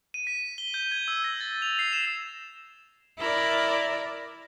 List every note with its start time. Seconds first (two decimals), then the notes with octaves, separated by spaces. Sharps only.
0.14 D#7
0.27 B6
0.58 G7
0.74 G6
0.92 G#6
1.08 E6
1.24 A#6
1.41 A6
1.62 F7
1.79 C7
1.93 E7
3.18 E4 A#4 D5